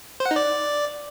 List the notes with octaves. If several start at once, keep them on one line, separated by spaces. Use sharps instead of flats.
C5
F#5
D#4
D5